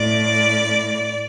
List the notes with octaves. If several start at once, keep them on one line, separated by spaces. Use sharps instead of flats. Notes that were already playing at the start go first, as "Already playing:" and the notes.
Already playing: A2 D5